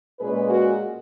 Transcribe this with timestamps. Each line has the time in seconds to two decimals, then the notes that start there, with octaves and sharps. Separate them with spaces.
0.19 A#2 G#3 C#4 G#4 B4
0.49 F#4 A#4